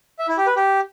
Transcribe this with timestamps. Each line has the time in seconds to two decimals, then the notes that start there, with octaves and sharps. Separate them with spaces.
0.19 E5
0.28 E4
0.38 G4
0.47 B4
0.56 G4